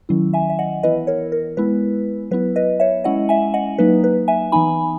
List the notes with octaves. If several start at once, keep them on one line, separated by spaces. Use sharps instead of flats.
D#3 F#3 C#4 E4
E5 G#5
E5
D#5 F#5
E3 B3 E4 B4 D#5
A#4 C#5
A#4
G#3 B3 E4 B4
F#3 B3 E4 B4
B4 D#5
C#5 E5
G#3 C#4 E4 D#5 F#5
E5 G#5
D#5 F#5
F#3 A#3 D#4 B4
B4
E5 G#5
E3 B3 D#4 G#5 B5